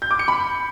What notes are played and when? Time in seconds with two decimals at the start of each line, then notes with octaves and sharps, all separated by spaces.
0.02 G6
0.11 D6
0.19 C#7
0.28 B5